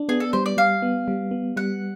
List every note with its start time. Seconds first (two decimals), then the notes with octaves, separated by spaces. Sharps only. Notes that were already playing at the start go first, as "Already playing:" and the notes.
Already playing: D4
0.09 B3 G#4
0.20 A4
0.33 G3 C5
0.46 D5
0.57 G3 F5
0.82 B3
1.08 G3
1.31 B3
1.56 G3 F#5